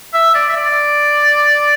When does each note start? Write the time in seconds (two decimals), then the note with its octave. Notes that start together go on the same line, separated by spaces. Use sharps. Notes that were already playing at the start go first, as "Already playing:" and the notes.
0.14 E5
0.35 D5
0.49 E5
0.57 D5